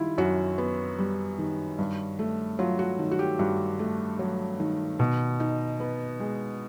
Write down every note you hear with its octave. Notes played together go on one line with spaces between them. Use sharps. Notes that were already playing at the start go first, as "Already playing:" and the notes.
Already playing: D#3 G3 E4 F4
F#2 F#4
B3
G3
D#3
G2
A3
F#3 F4
F#4
D#3
F#4
G4
G2 F#4
A3
F#3
D#3
B2
D#4
B3
G#3